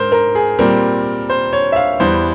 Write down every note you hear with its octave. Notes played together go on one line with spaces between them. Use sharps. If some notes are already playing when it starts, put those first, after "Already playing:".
Already playing: G#2 A#4 C5
A#4
G#4
A#2 G3 C4 A#4
C5
C#5
E5
F5
E2 E3 G3 C5